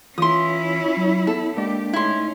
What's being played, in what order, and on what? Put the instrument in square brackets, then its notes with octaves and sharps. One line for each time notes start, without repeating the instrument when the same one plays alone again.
[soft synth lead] E3 [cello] C#4 E4 [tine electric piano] F4 [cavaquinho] C6 D#6
[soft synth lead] F#3
[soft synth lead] B3 [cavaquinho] A4
[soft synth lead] G#3 [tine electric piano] A#3 D4 D5 [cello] G4
[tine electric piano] A3 D#4 [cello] C#4 [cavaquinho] E4 C6